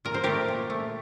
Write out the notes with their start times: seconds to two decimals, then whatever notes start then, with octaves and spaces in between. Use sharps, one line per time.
0.05 A#2 A#4
0.14 C5
0.24 A3 G4 A#4
0.48 A#2
0.70 A3